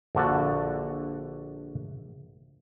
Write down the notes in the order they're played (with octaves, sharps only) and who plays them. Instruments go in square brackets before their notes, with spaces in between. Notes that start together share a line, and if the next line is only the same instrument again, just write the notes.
[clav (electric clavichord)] A#1 D3 F#4 A5